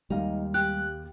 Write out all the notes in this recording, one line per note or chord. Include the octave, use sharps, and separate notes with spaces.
D#2 G3 G#3 D#4 F5
G4 F#6